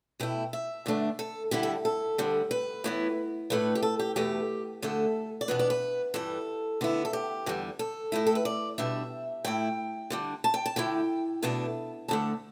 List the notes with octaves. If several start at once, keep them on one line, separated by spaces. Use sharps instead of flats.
B2 A3 E4 G5
E5
G2 D3 A3 D4
A4
D3 G3 E4 G4
A4
A4
D2 D3 G3
B4
A2 E3 B3 E4
A2 A3 D4 B4
G4
A4
G4
E2 B2 A3 G4
D2 D3 A3 A4
D5
E2 B2 B3 D4 B4
D5
B4
G2 E3 G3 A4
D3 B3 E4
A4
G4
E2 D3 G3
A4
A2 A3 E4
A4
B4
D5
B2 G3 D4 E5
A2 A3 E4 G5
D3 G3 D4
A5
G5
A5
D3 A3 E4 G5
E2 B2 A3 D4 A5
D2 D3 A3 A5